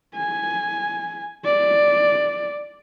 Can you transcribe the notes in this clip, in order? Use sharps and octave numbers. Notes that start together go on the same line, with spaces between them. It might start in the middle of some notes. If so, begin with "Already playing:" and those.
G#5
D5